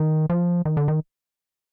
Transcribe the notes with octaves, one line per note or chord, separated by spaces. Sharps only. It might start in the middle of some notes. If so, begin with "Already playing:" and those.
Already playing: D#3
F3
D#3
D3
D#3